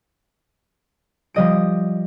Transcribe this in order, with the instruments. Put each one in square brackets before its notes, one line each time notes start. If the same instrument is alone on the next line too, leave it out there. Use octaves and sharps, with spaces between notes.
[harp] F3 G3 D#5 D7